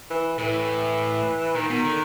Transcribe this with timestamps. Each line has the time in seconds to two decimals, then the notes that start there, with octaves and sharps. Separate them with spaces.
0.10 E3
0.38 A2 E3
1.55 A#2 D#3
1.70 B2
1.84 D3